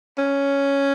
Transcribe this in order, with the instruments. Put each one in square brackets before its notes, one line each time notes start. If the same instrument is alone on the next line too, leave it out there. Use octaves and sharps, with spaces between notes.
[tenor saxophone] C#4